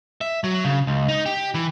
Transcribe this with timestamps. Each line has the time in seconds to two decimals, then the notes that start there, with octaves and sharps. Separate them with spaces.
0.21 E5
0.44 F#3
0.65 C#3
0.87 C#2
1.09 D#4
1.26 G4
1.54 E3